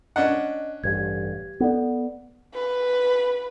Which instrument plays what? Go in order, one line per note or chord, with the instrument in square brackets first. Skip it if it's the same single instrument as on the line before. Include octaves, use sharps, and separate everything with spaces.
[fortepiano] C#4 D4 F#5 [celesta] D#5
[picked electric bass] A1 G2 [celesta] G4 G#6
[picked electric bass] B3 [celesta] A4 D5
[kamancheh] B4